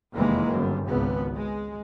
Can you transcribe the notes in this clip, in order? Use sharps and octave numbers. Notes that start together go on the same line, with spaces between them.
F1 E2 D#3 E3 G#3 A#3
G1 F#2
G#1 C#2 B3
G#3